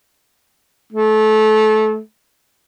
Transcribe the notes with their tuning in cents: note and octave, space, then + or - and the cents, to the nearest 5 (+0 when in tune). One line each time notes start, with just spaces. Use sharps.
A3 -25